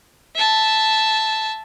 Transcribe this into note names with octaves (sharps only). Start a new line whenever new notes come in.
E5 A5